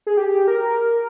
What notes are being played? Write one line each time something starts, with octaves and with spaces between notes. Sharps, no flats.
G#4
G4
A#4